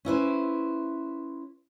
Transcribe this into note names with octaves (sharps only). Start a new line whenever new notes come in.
C#4 E4 B4 C5